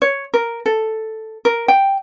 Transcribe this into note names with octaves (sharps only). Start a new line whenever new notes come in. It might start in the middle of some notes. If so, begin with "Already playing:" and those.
C#5
A#4
A4
A#4
G5